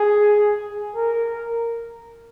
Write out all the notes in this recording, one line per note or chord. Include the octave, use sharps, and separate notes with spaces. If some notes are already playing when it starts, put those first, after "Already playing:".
Already playing: G#4
A#4